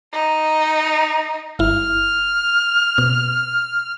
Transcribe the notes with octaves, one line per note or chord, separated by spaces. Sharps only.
D#4
G1 E4 F6
B2